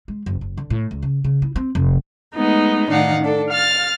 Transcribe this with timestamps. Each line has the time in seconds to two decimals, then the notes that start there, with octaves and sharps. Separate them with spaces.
0.08 G#3
0.26 F#1
0.41 F#1
0.57 D3
0.70 A2
0.91 C#2
1.02 C#3
1.24 C#3
1.42 E4
1.56 C4
1.75 F1
2.36 G#3 A3 B3 D#4
2.90 A2 D#3 D4 D#4 F5 F#5
3.22 D4 A4
3.51 F5 F6 A6